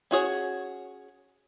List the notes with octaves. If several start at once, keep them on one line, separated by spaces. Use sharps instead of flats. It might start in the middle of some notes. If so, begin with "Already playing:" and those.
C#4 F#4 G#4 C#5